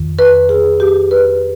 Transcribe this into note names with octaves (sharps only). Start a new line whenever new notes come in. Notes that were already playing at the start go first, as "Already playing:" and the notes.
Already playing: F2 D#3
B4
G#4
G4
B4